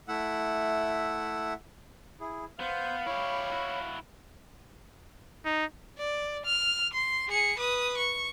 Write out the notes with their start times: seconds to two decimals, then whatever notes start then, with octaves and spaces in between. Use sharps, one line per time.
0.08 A3 E4 E5 F#5
2.20 E4 G#4
2.60 B3 C5 F5 G6
3.06 E4 G4 C#5 B5 C#6
3.52 E4 F#4
5.45 D#4
5.98 D5
6.45 F6
6.93 C6
7.28 G#4 C#7
7.58 B4 D#6
7.98 C#6